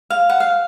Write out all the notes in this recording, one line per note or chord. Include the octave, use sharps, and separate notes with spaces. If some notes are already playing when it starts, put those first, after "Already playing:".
F5
F#5
F5